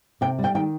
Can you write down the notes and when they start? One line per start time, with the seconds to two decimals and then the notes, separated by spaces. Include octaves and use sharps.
0.21 C3 G5
0.39 G3
0.44 G5
0.55 D#3 G5